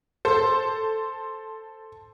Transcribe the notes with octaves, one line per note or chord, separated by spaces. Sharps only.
A4 C5